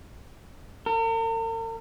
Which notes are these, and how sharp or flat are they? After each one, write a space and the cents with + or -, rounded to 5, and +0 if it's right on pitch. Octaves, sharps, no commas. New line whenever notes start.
A#4 -45